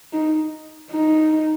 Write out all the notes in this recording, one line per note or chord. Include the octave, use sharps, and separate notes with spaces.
D#4
D#4